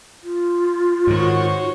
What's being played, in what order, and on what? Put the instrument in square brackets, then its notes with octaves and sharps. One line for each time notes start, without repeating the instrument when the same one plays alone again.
[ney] F4
[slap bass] G#2 D#3 [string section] F#4 C5 C#5